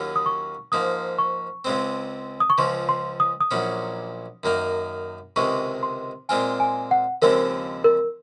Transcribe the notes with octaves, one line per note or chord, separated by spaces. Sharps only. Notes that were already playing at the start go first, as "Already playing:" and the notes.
Already playing: D#2 D#3 F#3 C#4 F4
D#6
C#6
G#2 F3 A#3 D#6
C#6
C#2 C#3 G#3 C4
D#6
C#6
C#2 C#3 F3 C6
C6
D#6
D#6
A#1 A#2 F#3 C#4
F#2 D#3 A#3 D#4
C#2 C3 D#3 G#3 C#6
C6
A#2 G#3 C4 F4 G#5
G#5
F#5
D#2 C#3 F3 G#3 C4 A#4
A#4